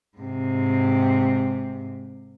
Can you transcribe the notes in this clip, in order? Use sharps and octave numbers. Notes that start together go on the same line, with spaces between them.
G#2 C3